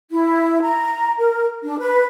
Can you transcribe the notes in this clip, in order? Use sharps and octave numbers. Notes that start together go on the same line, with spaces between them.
E4
A#5
A#4
D4
B4